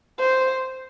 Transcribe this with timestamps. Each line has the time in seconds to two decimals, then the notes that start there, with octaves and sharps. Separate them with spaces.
0.19 C5